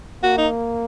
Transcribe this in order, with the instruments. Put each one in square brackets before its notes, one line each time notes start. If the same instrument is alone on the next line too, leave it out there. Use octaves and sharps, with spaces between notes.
[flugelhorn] A#3 [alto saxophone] F#4
[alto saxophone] D#4